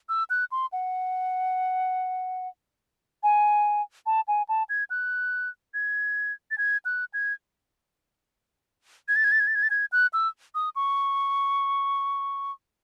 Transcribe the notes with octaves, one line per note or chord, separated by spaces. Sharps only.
E6
F#6
C6
F#5
G#5
A5
G#5
A5
G#6
F#6
G#6
A6
G#6
F#6
G#6
G#6
A6
G#6
A6
G#6
A6
G#6
A6
G#6
F#6
E6
D#6
C#6